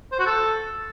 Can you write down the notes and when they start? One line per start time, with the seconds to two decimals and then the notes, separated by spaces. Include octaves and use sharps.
0.12 C5
0.19 F#4
0.26 A4